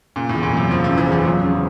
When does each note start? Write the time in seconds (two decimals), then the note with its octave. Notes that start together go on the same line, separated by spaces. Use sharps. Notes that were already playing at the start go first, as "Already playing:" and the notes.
0.16 A#2 C#3
0.29 A2
0.35 E2
0.43 A#2
0.53 C3 F#3
0.71 F#1 F3
0.84 F3
0.89 C#3
0.98 E3
1.07 E2 F3
1.25 F3 F#3
1.44 C#3